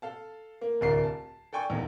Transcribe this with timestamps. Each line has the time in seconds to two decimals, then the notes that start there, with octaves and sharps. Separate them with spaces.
0.02 A4 F5 A5
0.61 A#3
0.81 D1 C2 A#4 D5 C7
1.04 A5
1.53 A4 D5 G5 G#5 C#6
1.70 D#1 E2 D#4